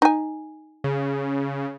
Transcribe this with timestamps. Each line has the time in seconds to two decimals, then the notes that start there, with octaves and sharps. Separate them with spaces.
0.02 D#4 G#5
0.84 C#3